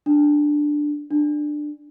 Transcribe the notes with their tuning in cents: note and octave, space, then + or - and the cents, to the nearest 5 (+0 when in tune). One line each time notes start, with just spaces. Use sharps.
D4 +5
D4 +15